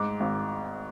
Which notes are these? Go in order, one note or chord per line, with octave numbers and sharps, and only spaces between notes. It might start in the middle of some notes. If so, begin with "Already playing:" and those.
Already playing: G#2 D6
G#1